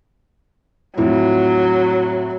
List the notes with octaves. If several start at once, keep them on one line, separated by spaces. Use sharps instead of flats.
F2 A2 F#3 E4